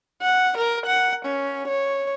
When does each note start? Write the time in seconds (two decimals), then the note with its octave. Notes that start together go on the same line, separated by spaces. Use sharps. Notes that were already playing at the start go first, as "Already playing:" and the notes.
0.22 F#5
0.58 A#4
0.86 F#5
1.26 C#4
1.68 C#5